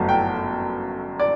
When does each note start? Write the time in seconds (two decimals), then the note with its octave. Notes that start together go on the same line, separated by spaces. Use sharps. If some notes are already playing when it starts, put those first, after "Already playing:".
Already playing: G1 F#2 F#3 A3 A5
0.09 G5
1.20 D5